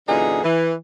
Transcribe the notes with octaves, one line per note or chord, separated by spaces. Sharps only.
F#2 A#2 D3 E3 D#4 G#4
E3